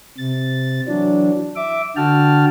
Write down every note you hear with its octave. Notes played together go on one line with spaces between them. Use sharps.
C3 A6
E3 F#3 D4
E5 D6
D3 F#4 G5 A5 F6